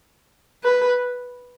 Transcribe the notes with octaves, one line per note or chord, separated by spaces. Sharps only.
B4